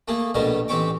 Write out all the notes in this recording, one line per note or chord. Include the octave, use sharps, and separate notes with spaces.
A3 A#3 G#4
A#1 B2 G3 A3 A#4
A1 C4 G4 C#6 D6